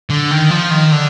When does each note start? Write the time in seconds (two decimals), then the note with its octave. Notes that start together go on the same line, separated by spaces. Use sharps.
0.10 D3
0.31 D#3
0.50 F3
0.71 D#3
0.92 D3